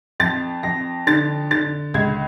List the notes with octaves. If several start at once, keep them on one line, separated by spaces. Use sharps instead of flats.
F2 A6
F2 A#6
D3 A6
D3 A6
C#2 G#6